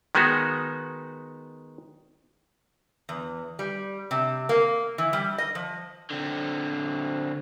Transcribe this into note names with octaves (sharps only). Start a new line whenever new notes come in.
D#3 G#3 B3 D#4 F#4
E2
G3
C3
A#3
E3
G3
D#5
F3
D3 C4